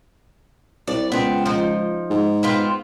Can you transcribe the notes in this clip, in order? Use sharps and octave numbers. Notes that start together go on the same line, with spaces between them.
C2 D5
C#2 B3 C4
F3 D#4
G#2
B3 C4 F4